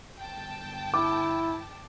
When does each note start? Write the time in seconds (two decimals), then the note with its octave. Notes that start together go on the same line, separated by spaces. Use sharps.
0.17 G1 G5 A5
0.94 E4 D6